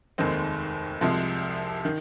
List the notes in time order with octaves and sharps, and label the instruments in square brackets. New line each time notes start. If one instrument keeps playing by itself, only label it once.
[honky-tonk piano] F1 D#2 D#3 G#3 C4
C2 C3 F3 G#3
D#3